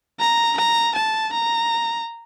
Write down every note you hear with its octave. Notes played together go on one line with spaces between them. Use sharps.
A#5
A#5
A5
A#5